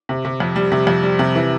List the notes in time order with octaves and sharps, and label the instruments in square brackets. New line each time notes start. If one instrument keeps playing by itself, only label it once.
[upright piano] C3
C3
F2
G3
C3
F2
G3
C3
E3